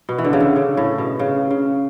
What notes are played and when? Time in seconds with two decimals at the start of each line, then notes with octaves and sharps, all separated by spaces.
0.09 B2
0.18 E3
0.25 D3
0.33 C#3
0.40 D3
0.56 C#3
0.77 A2
0.98 B2
1.19 C#3
1.51 C#3